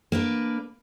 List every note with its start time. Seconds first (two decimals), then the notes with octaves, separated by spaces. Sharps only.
0.12 A#3 D4 B4